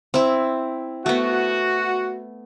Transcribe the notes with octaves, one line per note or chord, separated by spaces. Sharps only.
C4 E4
A3 B3 F#4